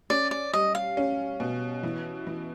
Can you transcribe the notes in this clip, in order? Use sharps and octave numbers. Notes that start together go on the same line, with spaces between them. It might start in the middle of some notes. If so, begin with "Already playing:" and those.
C#4 D5
D5
G3 D#5
F5
C#4
B2
E3
E3